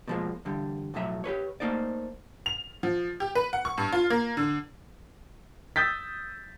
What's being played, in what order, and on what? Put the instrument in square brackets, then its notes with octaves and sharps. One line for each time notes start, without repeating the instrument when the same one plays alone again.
[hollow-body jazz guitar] B2 D#3 F3 G3 G#3 A#3
E2 G2 D3 G3
B1 F2 A2 F#3 E5
G4 A4 B4 C#5
A3 A#3 D#4 C5 D5
[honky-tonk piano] F7
F3
G4
B4
F#5
C#6
G2
F4
A#3
D3
[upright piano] D#6 E6 G6 A6 B6